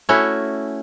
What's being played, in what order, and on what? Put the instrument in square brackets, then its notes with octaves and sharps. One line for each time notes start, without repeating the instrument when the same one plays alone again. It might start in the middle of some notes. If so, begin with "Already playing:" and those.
[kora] A3 C#4 E4 F#4